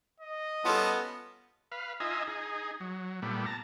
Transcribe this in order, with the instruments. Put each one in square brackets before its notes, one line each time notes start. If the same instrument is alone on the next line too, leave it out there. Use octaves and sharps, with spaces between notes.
[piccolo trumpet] D#5
[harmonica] G3 C#4 A5 [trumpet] B3 [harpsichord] F4 A4
[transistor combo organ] B4 F5
D#4 F4 D#5 E5 G#5
D#4 G#4
F#3
A#2 G3 A3 B3
A5 A#5